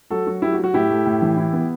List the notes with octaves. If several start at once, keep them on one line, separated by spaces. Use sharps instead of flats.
F#3 F#4 A4
F#3 F#4
F#3 E4 G4
F#4
F#3
F#4
A2 E4 G4
A3
A2
E3
E4
B3